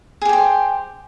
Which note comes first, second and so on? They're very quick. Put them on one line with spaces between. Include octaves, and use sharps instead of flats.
G#4 G4 G5 C5